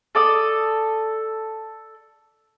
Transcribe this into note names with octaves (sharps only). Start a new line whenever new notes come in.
A4 D5 D#6